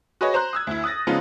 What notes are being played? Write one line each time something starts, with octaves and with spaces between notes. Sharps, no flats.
F#4 G#4 B4 C#5 D#5
C5 A#5 C6 F#6
D#6 E6 G#6
D2 E4
D#6 F#6 A6 A#6
C#3 F3 G#3 B3 D#4 F4